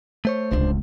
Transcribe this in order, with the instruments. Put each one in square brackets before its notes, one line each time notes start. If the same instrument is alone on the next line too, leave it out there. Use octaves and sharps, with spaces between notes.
[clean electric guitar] A3 C5 C#5
[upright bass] D1 C#2 [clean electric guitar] D4 C5